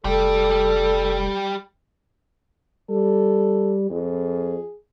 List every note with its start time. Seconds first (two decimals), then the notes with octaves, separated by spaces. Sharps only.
0.04 F1 G3 G4 A4
2.89 G3 A4
3.90 F2 G#4